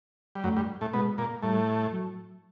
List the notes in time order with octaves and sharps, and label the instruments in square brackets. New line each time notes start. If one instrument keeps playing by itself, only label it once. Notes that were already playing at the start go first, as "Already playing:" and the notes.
[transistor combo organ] G3
[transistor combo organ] F#2 F#3 [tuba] A3
[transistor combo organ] G2 G3
A2 A3
[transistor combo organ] B2 B3 [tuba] G#3
[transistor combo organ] A#2 A#3
[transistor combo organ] A2 A3 [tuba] G3
[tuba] F#3